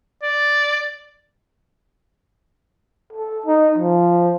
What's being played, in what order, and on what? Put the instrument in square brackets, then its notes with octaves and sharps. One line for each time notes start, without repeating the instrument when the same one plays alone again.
[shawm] D5
[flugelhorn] A4
D#4
F3